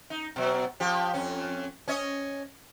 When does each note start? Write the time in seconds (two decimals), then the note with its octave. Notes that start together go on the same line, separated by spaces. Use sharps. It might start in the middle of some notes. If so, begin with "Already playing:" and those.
0.10 D#4
0.36 B2 F#3
0.80 F3 G4
1.14 F2 C#4
1.88 C#4 C#5 D#5